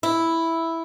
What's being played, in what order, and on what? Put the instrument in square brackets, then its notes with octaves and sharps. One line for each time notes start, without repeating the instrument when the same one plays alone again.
[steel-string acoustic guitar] E4